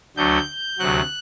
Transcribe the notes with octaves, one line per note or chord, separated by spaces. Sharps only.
D2 D3 F#3 G6
D2 C3 F#3 F#6